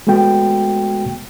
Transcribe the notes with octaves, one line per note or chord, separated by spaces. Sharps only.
G#3 A3 B3 F#4 G5